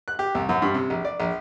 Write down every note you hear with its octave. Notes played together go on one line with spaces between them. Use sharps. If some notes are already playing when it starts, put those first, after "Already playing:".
F#6
G4
C2
F#2
G2
C3
A#1
D5
A#1